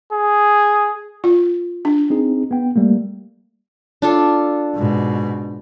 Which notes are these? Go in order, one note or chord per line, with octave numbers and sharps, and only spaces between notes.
G#4
F4
D4
C4 D#4 G#4
B3 G5
G3 A3 A#3
D4 F4 A4
G#2 B2